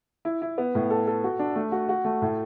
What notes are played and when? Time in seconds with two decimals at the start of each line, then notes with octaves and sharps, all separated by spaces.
0.25 E4
0.42 E4
0.58 B3
0.75 A2
0.90 A4
1.07 A4
1.24 F#4
1.39 D4
1.56 A3
1.72 F#4
1.89 F#4
2.05 A3
2.22 A2